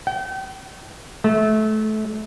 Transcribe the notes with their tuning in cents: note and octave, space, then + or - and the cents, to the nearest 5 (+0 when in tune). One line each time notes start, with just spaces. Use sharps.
G5 -40
A3 -25